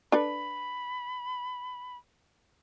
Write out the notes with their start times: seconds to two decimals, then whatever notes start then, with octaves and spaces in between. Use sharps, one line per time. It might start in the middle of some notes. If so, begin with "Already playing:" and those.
0.12 D4 A4 B4 B5